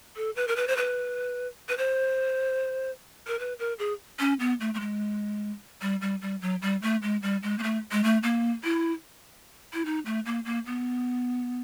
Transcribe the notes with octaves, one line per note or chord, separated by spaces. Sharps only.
A4
B4
A#4
B4
C5
B4
B4
C5
A#4
B4
A#4
G#4
C#4
B3
A3
A3
G#3
G3
G3
G3
F#3
G3
A3
G#3
G3
G#3
A#3
A3
G#3
A3
A#3
E4
E4
D#4
A3
A#3
A#3
B3